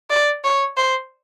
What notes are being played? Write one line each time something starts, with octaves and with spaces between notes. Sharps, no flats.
D5
C#5
C5